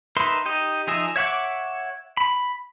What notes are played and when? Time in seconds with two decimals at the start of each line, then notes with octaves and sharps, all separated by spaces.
0.17 D#4 A#4 B4 E5 C6
0.45 D#4 G4 D#5
0.87 F3 D#4 G#4 D#5 E5
1.16 C#5 E5 F#5 C#6 D6
2.17 B5